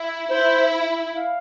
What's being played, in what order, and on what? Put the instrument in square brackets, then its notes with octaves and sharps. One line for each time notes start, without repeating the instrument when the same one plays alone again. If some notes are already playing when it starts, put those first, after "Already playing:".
Already playing: [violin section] E4
[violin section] E4 [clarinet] C5
[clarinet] F5